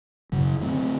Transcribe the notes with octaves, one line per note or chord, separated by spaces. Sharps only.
F#2 C#3 F#3
D3 A3 C4